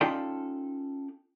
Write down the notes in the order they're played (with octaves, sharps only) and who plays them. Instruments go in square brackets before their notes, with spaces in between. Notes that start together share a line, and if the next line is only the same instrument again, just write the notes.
[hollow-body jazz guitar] C#4 D#4 F4 A4 D5 G5